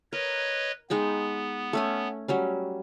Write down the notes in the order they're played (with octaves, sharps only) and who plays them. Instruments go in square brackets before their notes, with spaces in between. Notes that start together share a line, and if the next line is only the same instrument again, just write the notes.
[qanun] A#4 [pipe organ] B4 C#5 D#5
[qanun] G#3 D#4 G5 [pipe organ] B3
[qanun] A3 C#4 G#5
F#3 G3 C#4